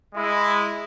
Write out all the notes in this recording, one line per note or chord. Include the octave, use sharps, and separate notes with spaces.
G#3 E4